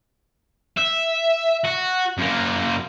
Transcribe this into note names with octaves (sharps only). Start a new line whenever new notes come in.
E5
F#4
F#2 A#3